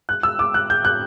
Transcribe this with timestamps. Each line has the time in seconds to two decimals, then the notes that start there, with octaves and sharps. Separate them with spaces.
0.09 F#6
0.23 E6
0.39 D6
0.54 F#6
0.70 G6
0.85 F#6